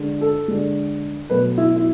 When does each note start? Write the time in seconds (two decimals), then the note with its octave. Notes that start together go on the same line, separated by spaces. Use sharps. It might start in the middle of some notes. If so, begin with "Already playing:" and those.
Already playing: D3 G#3
0.21 A4
0.48 D3 G#3
1.29 B2 F#3 A3 B4
1.57 E4
1.76 E4